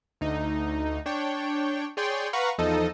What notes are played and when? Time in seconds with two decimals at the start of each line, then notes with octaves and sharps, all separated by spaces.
0.21 D2 D#4
1.06 D4 C#5 G5
1.97 G#4 C#5 D5 G5 C6
2.33 B4 F5 F#5 A#5 B5 C#6
2.58 E2 F3 D#4 A4 D#5